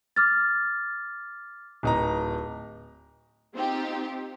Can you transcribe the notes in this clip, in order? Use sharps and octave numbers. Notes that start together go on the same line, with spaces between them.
D6 F6 A6
D1 D#4 A#5
C4 D#4 F4 G4